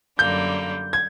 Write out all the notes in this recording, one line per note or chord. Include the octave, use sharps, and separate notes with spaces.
F#2 D3 G3 A#3 G6
G#6